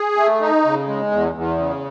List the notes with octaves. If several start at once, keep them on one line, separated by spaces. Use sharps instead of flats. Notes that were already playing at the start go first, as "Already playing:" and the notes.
Already playing: G#4
A3
D#4
C#3
G#3
E2
E2
C#3